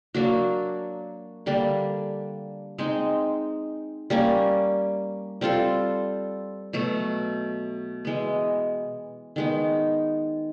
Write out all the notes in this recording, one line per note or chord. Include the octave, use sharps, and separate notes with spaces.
F#3 A#3 D4 F#4
D3 G3 A#3 D4
G#3 C4 D#4
G3 A#3 C#4
G3 C4 F4 A4
B2 F#3 A3
E3 G#3 B3
D#3 G#3 B3